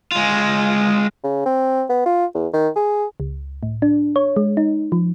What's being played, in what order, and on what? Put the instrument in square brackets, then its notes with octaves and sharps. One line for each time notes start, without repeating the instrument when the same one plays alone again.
[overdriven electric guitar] G#3 F4
[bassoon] C#3
C4
B3
F4
E2
D#3
G#4
[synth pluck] C#2
A2
D4
C#5
G#3
D#4
F3